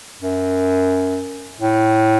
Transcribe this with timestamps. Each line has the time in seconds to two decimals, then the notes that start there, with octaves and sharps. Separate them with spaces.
0.22 F#2
1.60 A2